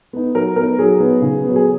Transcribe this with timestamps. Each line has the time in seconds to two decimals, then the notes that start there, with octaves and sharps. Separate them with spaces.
0.13 B3 D#4
0.35 F#3 A#4
0.56 B3 D#4 A#4
0.79 F#3 G#4
1.00 B3 D#4
1.22 C#3
1.43 B3
1.49 F#3
1.56 G#4